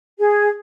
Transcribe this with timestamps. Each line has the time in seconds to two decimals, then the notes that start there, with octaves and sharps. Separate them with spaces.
0.18 G#4